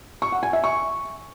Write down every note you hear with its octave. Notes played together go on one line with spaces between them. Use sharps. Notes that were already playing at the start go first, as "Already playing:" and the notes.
C#6
F#5
G#5
E5
C#6